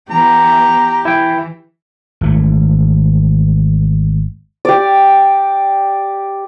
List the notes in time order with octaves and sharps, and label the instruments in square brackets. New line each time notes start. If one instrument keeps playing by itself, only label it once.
[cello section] E3 B3 [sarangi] G4 [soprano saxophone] A#5
[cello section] E3 [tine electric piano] E4 G5
[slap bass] G#1 E3 A3
[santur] G4 D5